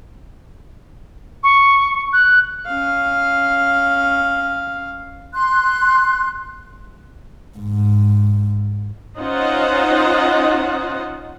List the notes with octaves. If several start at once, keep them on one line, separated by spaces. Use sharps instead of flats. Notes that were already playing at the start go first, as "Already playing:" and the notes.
C#6
F#6
C#4 F5
C6 F#6
G#2
C#4 D#4 F4 C5 D#5 F#5